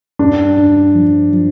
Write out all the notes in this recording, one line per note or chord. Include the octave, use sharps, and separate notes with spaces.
G2 D4
G2
F3
F3